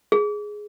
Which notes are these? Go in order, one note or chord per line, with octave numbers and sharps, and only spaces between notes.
G#4